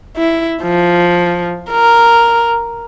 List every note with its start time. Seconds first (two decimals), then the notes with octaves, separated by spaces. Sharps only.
0.17 E4
0.62 F3
1.70 A#4